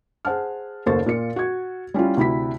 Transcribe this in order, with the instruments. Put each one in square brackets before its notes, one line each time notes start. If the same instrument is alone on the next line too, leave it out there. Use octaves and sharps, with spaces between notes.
[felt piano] G#4 C5 F#5 A5 F6
F#1 D#2 A4 C5 C#6 A6
A#2 F4 C#7
F#4 G#6
G3 C#4 E4 F4
D2 C3 E4 B5 B6